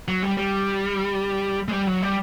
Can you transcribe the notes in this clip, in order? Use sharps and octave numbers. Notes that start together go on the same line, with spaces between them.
F#3
G3
G3
G#3
G3
F#3
G3